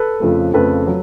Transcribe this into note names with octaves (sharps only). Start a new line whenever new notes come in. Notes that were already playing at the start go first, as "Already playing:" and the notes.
Already playing: A4 B4
F2 C#3 F3 A3
F2 C#3 F3 A3 A4 B4
F#3